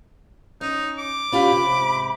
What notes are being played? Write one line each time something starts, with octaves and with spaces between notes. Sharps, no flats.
C#4 D#4
D6
C#4 F4 G4 B5
G#2 C3